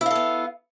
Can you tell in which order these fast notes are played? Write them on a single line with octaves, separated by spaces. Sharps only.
E4 F5 A4 B3